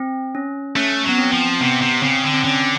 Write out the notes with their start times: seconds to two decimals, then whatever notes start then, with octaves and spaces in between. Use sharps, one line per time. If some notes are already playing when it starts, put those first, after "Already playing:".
Already playing: C4
0.35 C#4
0.76 A3 C#4
1.05 F#3 B3
1.18 C4
1.33 F3
1.49 C4
1.61 C3 B3
1.82 C3
2.02 C#3 C4
2.24 D3
2.34 C4
2.44 D3 C#4